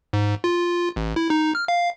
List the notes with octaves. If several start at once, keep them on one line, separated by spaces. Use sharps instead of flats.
G#2
F4
A1
E4
D#4
F6
F5